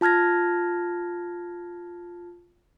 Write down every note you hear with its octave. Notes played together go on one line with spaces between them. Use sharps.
F4 A5 F6 G#6 A#6